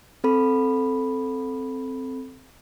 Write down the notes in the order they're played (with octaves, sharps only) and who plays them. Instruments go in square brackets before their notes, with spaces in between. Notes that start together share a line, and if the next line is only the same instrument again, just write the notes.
[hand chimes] C4 A4 B5